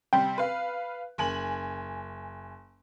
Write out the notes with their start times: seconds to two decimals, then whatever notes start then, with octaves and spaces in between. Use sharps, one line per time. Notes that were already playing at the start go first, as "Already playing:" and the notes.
0.13 C3 G3 C4 G5
0.38 B4 F5
1.18 F#1 G#5 F#7